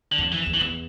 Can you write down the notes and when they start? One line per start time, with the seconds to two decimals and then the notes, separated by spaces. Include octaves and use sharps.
0.12 D3
0.18 F2
0.32 E3
0.46 E2
0.54 E3
0.61 E2